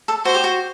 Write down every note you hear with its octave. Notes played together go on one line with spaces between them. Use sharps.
A4
F#4 C5
G4
F#4